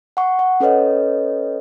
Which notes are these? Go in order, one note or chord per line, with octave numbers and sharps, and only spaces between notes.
F#5 C#6
F#5
C#4 A4 B4 C#5 D#5